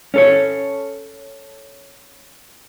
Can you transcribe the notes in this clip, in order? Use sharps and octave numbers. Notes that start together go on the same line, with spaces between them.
C#4 A4 C#5